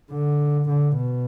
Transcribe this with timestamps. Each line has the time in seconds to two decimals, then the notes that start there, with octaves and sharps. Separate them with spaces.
0.10 D3
0.69 D3
0.96 B2